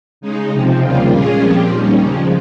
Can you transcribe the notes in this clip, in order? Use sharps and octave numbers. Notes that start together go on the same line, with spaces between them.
C#3 G#3 D#4
C3 F3 C4
D#2 C#3 G3 A#3 F4
A#2 G#3 C#4 F4 G#4
A#2 F3 C4 G4
D#2 D#3 G3 C#4
C#3 F3 G#3